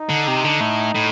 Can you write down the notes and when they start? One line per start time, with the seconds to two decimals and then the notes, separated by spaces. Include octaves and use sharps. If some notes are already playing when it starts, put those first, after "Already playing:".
Already playing: D#4
0.10 D3
0.28 C3
0.45 D3
0.61 A2
0.94 A2